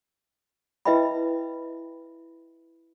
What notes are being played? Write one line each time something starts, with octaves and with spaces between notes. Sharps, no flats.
E4 B4 D#5 E5 G5 B5